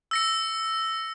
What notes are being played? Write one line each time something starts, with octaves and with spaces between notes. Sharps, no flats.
E6 A#6 C#7